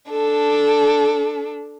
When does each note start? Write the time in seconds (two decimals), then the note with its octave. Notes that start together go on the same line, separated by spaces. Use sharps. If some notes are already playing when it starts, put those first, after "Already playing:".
0.11 D4 A4